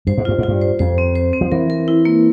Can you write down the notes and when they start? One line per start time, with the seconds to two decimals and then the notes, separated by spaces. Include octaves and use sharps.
0.07 G2 C5
0.18 G#2
0.25 G2 F4
0.38 G#2
0.43 G2 F4
0.62 C5
0.79 F2 C5
0.98 C4
1.15 C5
1.33 C4
1.41 F3
1.52 E3 A#4
1.70 A#4
1.88 E4
2.05 A#3